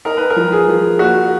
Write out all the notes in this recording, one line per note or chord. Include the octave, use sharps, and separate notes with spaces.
D#4 A#4
B4
A#4
F3
G#4
F3
A#3 F#4